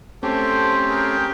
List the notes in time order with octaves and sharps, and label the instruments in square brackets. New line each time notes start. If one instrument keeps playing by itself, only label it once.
[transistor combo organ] A3 C4 C#4 [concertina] G4 [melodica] A4 C5
[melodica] G#4 A#4 G5